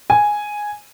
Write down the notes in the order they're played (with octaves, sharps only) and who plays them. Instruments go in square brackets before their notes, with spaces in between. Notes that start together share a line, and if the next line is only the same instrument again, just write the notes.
[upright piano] G#5